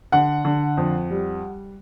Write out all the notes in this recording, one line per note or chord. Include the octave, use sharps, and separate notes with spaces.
D3 F#5
D3
F2
G3